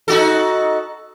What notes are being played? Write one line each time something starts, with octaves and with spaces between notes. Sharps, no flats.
D#4 F#4 A4